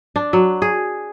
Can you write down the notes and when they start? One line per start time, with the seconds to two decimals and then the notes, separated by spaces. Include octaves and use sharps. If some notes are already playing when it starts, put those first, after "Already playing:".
0.16 D4
0.33 F#3
0.62 G#4